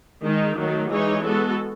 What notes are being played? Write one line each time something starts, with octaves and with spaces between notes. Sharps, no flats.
D#3 G#3 D#4
D#3 F#3 A3
E3 G#3 D#4 G#4 C#5
G#3 B3 F#4 A4